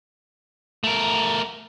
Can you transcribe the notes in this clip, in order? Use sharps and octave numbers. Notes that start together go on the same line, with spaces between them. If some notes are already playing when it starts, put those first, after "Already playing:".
A3 A#4